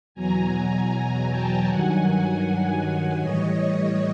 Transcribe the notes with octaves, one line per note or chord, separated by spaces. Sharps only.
E2 B2 F#3 G#5 A#5
G5 A5
G2 D#3 F#3 F#5 G#5
F#5 G#5
A2 E3 G3 C#5 D#5
C#5 D#5